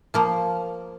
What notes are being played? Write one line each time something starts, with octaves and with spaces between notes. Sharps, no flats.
F3 A#3 C5